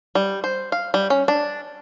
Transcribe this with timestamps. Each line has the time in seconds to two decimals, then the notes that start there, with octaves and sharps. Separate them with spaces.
0.15 G3
0.44 C5
0.72 F5
0.94 G3
1.10 C#4
1.28 D4